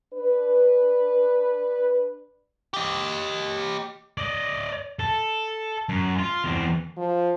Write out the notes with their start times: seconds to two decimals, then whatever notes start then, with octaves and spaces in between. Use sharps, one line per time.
0.14 D4 B4
2.74 G4 D#5
4.18 D5 D#5
4.99 A4
5.89 F#2
6.19 F4
6.44 E2 C4
6.97 F3